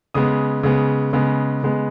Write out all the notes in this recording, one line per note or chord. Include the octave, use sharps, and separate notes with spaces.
C#3 G#3 B3 D#6
C#3 G#3 B3
C#3 G#3 B3
C#3 G#3 B3